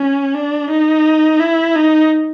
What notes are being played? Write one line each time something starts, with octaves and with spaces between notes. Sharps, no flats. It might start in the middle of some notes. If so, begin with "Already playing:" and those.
Already playing: C#4
D4
D#4
E4
D#4